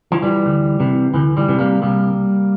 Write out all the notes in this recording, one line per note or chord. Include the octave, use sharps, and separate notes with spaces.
E3 F3
E3 G3
D2
C3 E3
D2 E3
E3 G3
C3 E3
G3 A#3
C2 G3 A#3